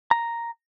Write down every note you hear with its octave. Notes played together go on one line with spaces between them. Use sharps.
A#5